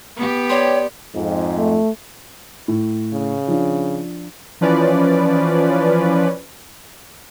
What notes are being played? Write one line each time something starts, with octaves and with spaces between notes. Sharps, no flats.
B3 G4
C#5 D5 G5 C6
F2 G#2
A3
A2
C#3
F3 D4
E3 F3 C#4 B4 D5